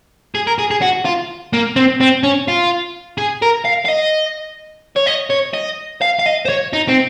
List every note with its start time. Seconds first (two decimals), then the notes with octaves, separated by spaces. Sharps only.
0.35 G#4
0.47 A#4
0.58 G#4
0.71 G#4
0.82 F#4
1.05 F4
1.53 A#3
1.76 C4
2.01 C4
2.23 C#4
2.48 F4
3.18 G#4
3.42 A#4
3.65 F5
3.86 F5
3.89 D#5
4.96 C#5
5.07 D#5
5.31 C#5
5.54 D#5
6.02 F5
6.19 F5
6.26 D#5
6.45 C5
6.49 C#5
6.73 D#4
6.89 C4